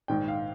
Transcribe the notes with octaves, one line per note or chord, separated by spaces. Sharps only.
A#1 G#2 D#3 G5
F5